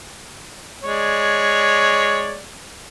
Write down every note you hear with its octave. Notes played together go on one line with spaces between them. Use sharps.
G#3 C#5 D5